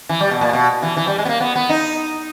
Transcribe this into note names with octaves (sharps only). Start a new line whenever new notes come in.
E3
G3
B2
A#2
B2
E3
E3
G3
G#3
B3
A#3
B3
B3
D#4